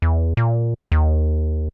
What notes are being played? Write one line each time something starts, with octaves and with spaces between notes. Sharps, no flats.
E2
A#2
D#2